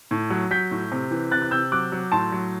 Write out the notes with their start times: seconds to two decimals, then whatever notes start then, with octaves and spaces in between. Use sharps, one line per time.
0.11 A2
0.30 F#3
0.51 F#3 G6 B6
0.71 A2
0.92 C3
1.11 E3
1.31 C3 F#6 A6
1.42 F#6
1.51 C3 E6 G6
1.72 F#3 D6 F#6
1.92 F#3
2.12 A2 A5 C6
2.32 F#3